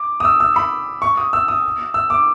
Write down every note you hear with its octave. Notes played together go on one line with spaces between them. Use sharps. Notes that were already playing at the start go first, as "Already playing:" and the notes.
Already playing: D6
D#6
E6
E6
B5
C#6
D#6
E6
D#6
E6
D6